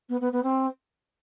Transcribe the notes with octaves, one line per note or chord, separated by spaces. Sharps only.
B3
B3
B3
C4